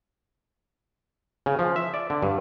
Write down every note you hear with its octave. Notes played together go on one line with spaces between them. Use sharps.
C#3
F3
E5
D5
D3
G2